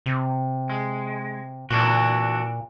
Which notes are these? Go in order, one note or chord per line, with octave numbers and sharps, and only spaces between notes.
C3
G#3
A#2 E3 D4 F#4